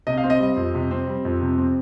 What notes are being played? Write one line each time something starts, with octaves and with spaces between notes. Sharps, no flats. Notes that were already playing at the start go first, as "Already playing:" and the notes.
C3 D#5
F5
C4
D#5
G3
F2
C3
C4
G3
F2
C3
C4